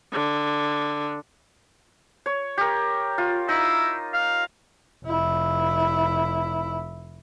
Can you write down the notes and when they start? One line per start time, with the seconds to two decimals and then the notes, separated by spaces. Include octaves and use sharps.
0.12 D3
2.26 C#5
2.58 G4 A#4
3.18 F4
3.49 D#4 E4
4.13 F5
5.05 F1 E4